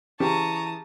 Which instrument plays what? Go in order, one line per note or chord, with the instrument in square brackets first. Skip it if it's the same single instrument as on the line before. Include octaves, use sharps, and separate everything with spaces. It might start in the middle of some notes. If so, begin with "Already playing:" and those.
[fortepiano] C#3 G4 [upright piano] E3 [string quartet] A5 D#6 [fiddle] A#5 C#6